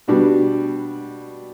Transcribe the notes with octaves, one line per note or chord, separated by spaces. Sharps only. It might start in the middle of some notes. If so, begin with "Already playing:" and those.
B2 G3 B3 D4 F#4